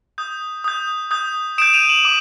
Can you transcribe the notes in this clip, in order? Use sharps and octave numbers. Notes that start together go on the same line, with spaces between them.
D#6 G6
D#6 G6
D#6 G6
D#6 G6 D7 E7
D#7 F7
E7 F#7
D6